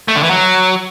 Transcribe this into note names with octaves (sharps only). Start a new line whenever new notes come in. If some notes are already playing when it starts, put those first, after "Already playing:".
A3
D3
E3
F#3